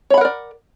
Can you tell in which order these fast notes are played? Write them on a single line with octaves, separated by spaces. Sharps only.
C#5 B5 F#5 A#4 D5